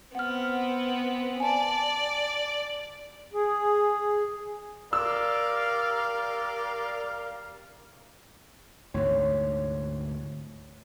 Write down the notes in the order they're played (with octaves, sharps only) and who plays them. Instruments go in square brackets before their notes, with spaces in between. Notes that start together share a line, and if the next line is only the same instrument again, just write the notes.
[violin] B3 C4 [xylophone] F#5 F6
[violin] D5 [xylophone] G#5 A5
[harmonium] G#4
[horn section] G4 A#4 F5 [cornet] D5 [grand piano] E6
[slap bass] D2 G#2 C3 [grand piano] C#5